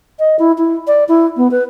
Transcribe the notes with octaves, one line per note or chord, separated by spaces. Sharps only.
D#5
E4
E4
D5
E4
B3
B4